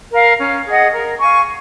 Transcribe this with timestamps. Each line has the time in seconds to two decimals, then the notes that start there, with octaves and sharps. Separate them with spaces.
0.12 A#4 F5
0.39 C#4
0.66 G#4 D#5 F#5
0.93 A#4
1.20 F5 G#5 C#6